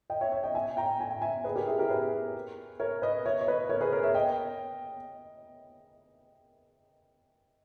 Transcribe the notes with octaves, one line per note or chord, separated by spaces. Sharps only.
D#5 G5
C#5 E5
C#5 E5
D#5 G5
E5 G#5
G5 A#5
G#5
G5
E5 G#5
G#4 B4
G4 A#4
E4 G#4
G4 A#4
G#4 B4
A#4 C#5
B4 D#5
C#5 E5
C#5
B4 D#5
A#4 C#5
G#4 B4
A#4 C#5
C#5 E5
D#5 G5